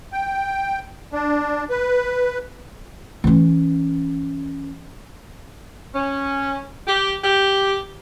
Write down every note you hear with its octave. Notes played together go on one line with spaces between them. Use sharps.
G5
D4
B4
E3 C#4
C#4
G4
G4